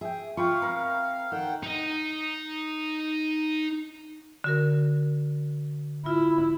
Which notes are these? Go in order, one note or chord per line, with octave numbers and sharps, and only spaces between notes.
G#4 E5 G5
F4 F5 G5 B5 C#6
C4 A#4
D#3 A4 F#5 G5
D#4 D#5
D3 F#4 A#4
E4 F4